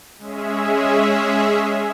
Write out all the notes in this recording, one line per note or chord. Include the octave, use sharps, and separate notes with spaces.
G#3 C#4 G#4 E5